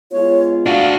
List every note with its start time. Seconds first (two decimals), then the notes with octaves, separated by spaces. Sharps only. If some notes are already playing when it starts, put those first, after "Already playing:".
0.12 G#3 B3 F4 C#5
0.66 D4 F#4 F5